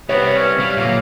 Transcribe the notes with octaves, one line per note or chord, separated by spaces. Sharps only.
G3 B3 C4 B4 C#5 E5
C#4
G3 F5
A#2 D3 F#3 A#3